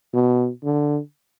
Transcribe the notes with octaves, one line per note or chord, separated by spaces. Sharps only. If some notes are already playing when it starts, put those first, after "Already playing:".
B2
D3